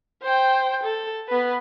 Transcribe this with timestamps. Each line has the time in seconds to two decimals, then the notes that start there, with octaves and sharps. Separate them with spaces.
0.23 C5 G5
0.83 A4
1.28 B3 B4